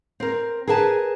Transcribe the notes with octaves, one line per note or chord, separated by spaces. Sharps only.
C4 A#4
G#4 A#4 B4 G#5 A5